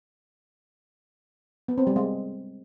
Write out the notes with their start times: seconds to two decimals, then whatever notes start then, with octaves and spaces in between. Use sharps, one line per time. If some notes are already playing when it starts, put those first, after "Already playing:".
1.68 B3
1.78 C4
1.87 G3
1.96 G#3